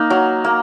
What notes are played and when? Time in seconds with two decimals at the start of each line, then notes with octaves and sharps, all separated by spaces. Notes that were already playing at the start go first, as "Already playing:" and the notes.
Already playing: A#3 D#4
0.10 F#3
0.44 A#3